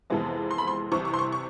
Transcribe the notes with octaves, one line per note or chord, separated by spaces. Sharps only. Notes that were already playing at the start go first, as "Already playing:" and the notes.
F2 C3 E3 G#3 B3
C6
B5
C6
C2 C3 E3 C#6
C#6
C6
C#6
C#6